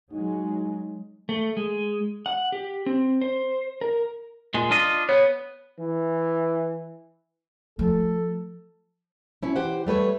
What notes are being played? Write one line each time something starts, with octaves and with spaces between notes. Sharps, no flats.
F#3 G#3 D#4
A3
G#3
F#5
G4
C4
C5
A#4
A#2 G#3
D4 F4 D#5
B3 C#5
E3
F3 A3 A4
B2 C#4 E4
E3 G4 C5 F#5
G3 A3 B4 C#5